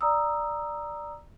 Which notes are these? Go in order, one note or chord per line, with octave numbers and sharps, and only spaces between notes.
D5 A#5 D#6 E6